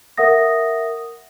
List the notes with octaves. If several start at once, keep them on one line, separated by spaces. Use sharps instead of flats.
A#4 E5 F#5 D#6 A#6